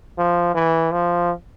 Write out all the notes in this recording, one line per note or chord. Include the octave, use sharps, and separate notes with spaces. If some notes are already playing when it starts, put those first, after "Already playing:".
F3
E3
F3